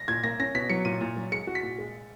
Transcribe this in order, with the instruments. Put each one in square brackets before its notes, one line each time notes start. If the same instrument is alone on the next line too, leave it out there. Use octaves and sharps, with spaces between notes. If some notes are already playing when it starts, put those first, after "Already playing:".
Already playing: [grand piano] A#6
[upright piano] A#2 [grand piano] G#6
[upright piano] A#3 [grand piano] A#6
[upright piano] C#4 [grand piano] A#6
[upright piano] B2 [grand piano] B6
[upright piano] F#3 [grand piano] C#7
[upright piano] A#2 [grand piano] D#7
[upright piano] A#2
F#3
[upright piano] G#3 [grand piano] C#7
[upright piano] F#4
[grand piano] B6
[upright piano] A#2
G#3